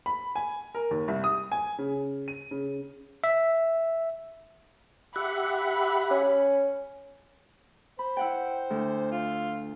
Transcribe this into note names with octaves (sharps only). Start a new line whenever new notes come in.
B5
G#5
A#4
D#2
C2
D#6
G#5
C#3
D#7
C#3
E5
G4 E5 F#5 B5
C#4
C5 B5
E4 F#5 G5
D2
F4